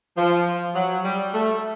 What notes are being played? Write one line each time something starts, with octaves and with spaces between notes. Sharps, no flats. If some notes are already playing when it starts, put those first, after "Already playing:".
F3
F#3
G3
A3